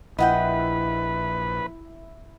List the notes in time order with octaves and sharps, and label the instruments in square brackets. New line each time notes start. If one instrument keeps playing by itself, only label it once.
[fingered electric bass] A#1 [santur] E4 [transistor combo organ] B4 [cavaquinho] D#5 F#5 G5